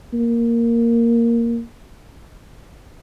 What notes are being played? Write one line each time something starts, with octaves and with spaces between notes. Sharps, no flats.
A#3